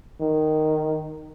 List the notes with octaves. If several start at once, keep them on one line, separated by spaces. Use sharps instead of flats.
D#3